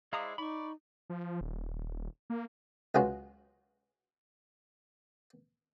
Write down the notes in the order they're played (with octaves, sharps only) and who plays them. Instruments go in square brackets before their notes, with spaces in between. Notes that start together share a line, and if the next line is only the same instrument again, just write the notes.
[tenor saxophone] G#3 [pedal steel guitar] E4 C5 D5 [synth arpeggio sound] F5 A#5 D#6
[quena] D#4 [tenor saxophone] D5 [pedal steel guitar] B5 C#6
[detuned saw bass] F3
D#1
A#3
[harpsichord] C#2 F#3 G#3 B3 F4 F#4